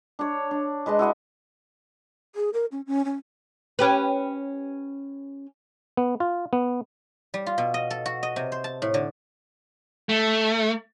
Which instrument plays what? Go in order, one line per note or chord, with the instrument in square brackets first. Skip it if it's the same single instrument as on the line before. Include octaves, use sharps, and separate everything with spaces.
[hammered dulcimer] D4 C#5
D4
G#3 B4 D#5 A5
E4 F#4 D#5 E5
[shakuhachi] G#4
A#4
C#4
C#4
C#4
[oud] C#4 G4 B4
[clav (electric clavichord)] B3
F4
B3
[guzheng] G3
F4
B2
D#5
A4
F#4
D#5
C3
C5
A5
A2
D3
[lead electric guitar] A3